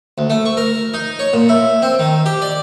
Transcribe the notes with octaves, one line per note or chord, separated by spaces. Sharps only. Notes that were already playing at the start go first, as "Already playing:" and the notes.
D2
A3
C#6
A#4
D#4
C#5
A#2
E4
C4
D#3
G4
D5